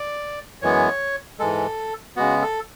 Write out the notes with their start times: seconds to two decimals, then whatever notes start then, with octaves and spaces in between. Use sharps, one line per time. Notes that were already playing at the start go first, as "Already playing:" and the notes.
Already playing: D5
0.62 F#2 E3 G#3 B3 C#5
1.39 G#2 E3 G#3 A4
2.16 C#3 G#3 B3 F#4
2.42 A4